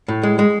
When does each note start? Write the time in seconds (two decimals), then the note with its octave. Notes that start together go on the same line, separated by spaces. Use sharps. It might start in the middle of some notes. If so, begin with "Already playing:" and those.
0.08 A2
0.23 G#3
0.39 G#3